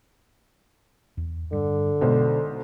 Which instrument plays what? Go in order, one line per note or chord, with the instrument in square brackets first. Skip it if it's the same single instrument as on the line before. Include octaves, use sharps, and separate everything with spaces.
[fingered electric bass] E2
[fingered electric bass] G2 [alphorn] D3
[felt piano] B1 C5 [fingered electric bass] B2 G#3